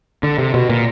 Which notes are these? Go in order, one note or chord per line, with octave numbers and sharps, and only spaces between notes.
D3
C3
B2
A#2